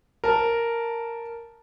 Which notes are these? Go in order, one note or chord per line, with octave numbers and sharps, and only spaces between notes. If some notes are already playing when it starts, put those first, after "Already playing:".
A#4 A5